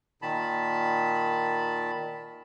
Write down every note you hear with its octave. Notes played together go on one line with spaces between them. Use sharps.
A#2 D#3 A5 B5